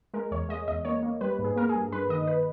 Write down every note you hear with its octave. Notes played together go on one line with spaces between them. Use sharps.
G#3 A#4
E2 C#5
G#3 D#5
E2 D#5
A#3 C#5
A#3
G3 B4
G#2
G#4
A#3 A#4
G#4
G2
G2 B4
D#3 D#5
B4